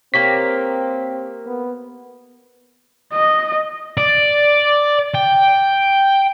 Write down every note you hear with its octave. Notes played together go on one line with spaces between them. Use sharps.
A#3 C4 G4 C#5 B6
B3
D#5
D5
G5